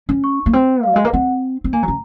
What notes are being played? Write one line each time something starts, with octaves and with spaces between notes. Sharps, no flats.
C#4
C#6
A#3
C4
F5
F#3
G#3 D#5
A#3
C4 F#5
C4
A#3 G#5
F#3 A#5
C#3